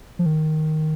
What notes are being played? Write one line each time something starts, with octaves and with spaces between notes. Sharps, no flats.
F3
D#3